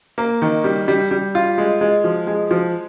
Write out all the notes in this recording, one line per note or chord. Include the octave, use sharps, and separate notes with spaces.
A#3
D#3
G3
G3
G3
F4
G#3
G#3
F3
G#3
F3